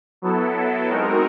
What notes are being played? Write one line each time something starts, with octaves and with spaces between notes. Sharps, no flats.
F#3 B3 E4 A4
G#3 C4 D#4 F#4 A#4